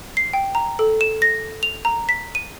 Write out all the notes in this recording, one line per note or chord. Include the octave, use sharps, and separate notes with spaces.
C7
G5
A#5
A4
E7
A#6
F7
A#5
B6
D#7